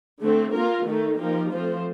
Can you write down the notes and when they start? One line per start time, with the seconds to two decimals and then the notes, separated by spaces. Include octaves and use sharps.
0.22 D3 A3 C4
0.55 A#3 F4 A#4
0.87 D#3 A3 D#4
1.20 F3 A#3 D#4 G4 A#4
1.52 F3 A3 C4 F4 C5